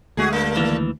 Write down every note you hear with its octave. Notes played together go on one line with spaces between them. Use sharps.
D2 G#3 A3 F#4 G#4
G2 A#3
D#2 E3